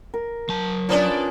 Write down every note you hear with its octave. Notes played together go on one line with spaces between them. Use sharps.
A#4
F#3 A5
F3 A#3 B3 C#4 D4 D5